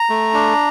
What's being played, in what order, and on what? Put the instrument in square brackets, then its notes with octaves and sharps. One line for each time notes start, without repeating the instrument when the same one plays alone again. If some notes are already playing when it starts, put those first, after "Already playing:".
Already playing: [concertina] A#5
A3
D4